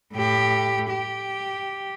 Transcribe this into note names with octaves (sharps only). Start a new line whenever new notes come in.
A2 G4
G4